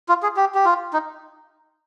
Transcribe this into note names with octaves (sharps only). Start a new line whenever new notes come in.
F4
G#4
G4
G4
F4
D#4